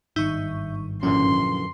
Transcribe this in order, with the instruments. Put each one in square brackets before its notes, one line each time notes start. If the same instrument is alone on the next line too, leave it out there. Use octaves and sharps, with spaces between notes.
[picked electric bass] G#1 G2 D#3 [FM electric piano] D#4 C#6 [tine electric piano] E5 G6
[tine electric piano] F#2 D3 E3 [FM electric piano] A#2 F3 C#4 [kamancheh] C6